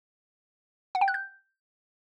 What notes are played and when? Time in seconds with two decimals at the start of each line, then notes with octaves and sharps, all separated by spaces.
0.95 F#5
1.01 G5
1.08 F#6
1.14 G6